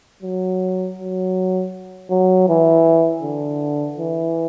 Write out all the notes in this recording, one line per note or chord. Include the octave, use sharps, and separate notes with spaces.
F#3
F#3
F#3
E3
D3
E3